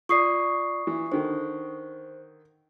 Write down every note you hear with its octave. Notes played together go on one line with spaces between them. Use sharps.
F4 D5 C#6 D#6 C7
E3
D3 D#3 C5